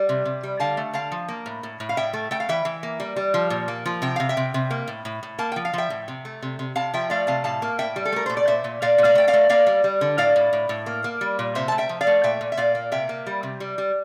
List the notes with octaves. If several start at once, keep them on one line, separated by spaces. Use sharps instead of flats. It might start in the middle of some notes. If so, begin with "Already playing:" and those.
Already playing: G3
C3
C3
G3
D3 F5 A5
A3
D3 F5 A5
F3
A#3
A2
A2
A2
F5
A2 E5 G5
A3
A3 G5
F5
E3 E5 G5
E3
A#3
G3
G3
F3
A#2
A#3
F3
C3 G5
C3 F5
E5 G5
C3
C3
A#3
A2
A2
A2
A#3 A5
F3 G5
F5
F3 E5 G5
A2
C3
A3
C3
C3
C3 F5 A5
F3 E5 G5
A3 D5 F5
C3 F5 A5
A2 F5 A5
A#3
A2 E5 G5
G3
A4
A3 A#4
A#2 C5
D5
A#2 C5 E5
A#2
A#2 D5 F5
A#2
D5 F5
A3 G5
D5 F5
A3
A#3 D5 F5
G3
G3
D3
A2 D5 F5
A2
A2
A2
A#3
A#3
G3
A#2
C3 C5 E5
A3 A5
E5 G5
F3
D5 F5
A3
A#2 E5 G5
A#2
E5
A#2 D5 F5
A#3
C3 E5 G5
A#3
G3
C3
G3
G3